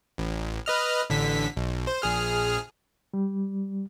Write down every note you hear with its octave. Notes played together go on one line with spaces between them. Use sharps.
A1
B4 D#5 F6
A1 D3 B6
B1
C5
A#1 G#4 F6
G3